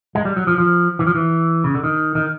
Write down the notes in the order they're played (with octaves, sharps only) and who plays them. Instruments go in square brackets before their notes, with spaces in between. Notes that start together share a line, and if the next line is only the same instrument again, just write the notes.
[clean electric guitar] G#3
G3
F#3
F3
F3
E3
F3
E3
C#3
D3
D#3
D#3